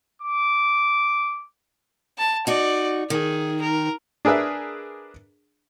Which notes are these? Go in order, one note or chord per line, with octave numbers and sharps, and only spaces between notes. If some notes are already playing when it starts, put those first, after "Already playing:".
D6
A5
D#4 F#4 D5
D#3 G#4
A#4
D4 G#4 A#4 B4 E5